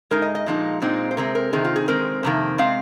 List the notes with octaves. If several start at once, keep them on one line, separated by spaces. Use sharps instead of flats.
G#2 G#3 D#4 A#4
D#5
D#5
A#2 F3 G#3 D#4
A#2 G#3 C4 D#4
C5
C3 G#3 C4 A#4
A#4
C3 D#3 C4 D#4 G#4
F4
G#4
D#3 G#3 C4 A#4
F2 C3 D#3 A#3
C3 G#3 C4 F5